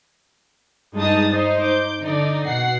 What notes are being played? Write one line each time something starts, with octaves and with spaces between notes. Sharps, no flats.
G2 G#3 D#4 A5 D#6 A6
D#4 C5
D6 G6
D3 D#4 D5
B2 F#5 C7